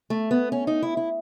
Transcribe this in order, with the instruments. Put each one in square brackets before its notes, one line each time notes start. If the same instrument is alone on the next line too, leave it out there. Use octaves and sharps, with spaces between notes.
[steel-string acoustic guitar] A3
B3
C#4
D#4
E4
E4